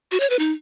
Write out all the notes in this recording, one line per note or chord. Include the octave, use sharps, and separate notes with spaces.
F#4
C#5
B4
D#4